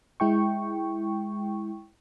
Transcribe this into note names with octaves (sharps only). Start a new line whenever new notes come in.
G#3 E4 G5 C#6